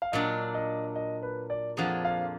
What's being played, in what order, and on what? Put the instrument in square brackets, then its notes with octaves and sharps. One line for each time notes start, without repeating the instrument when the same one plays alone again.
[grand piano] F5
[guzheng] A#2 F#3 D4 [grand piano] D#5
[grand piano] D#5
D#5
B4
D5
[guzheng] F2 F3 A#3 D4 G#4 [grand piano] F#5
[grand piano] F5